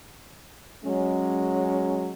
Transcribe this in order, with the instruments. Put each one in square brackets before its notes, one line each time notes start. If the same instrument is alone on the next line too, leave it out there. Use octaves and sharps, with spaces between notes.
[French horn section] F#3 G#3 C#4